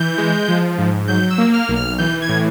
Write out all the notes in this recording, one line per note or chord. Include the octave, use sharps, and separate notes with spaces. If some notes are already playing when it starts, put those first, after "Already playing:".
Already playing: E3 G6
G#3
F3
G#2
F#3 G6
E6
A#3
F6
B1
F6
E3 G6
G#6
A2